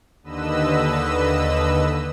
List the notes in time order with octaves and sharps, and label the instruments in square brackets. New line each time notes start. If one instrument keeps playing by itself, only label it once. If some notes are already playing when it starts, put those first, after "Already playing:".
[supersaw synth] D#2 D3 B4 D#5 E6